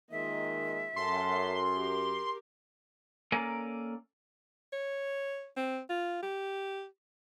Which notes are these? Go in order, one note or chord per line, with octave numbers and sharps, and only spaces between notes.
D#3 G#3 A#3 F4 D#5 E5
F#2 A4 A5 C6
G4 A#4
A#3 C#4 A4 A#4 D5 G#5
C#5
C4
F4
G4